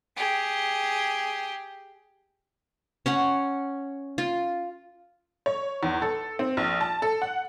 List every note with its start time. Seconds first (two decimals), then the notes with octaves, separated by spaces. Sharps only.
0.16 G4 G#4
3.06 C#4 C#5 F#5
4.18 F4
5.46 C#5
5.83 E2
6.02 A4
6.39 C4
6.57 A#1
6.81 A5
7.02 A4
7.22 F#5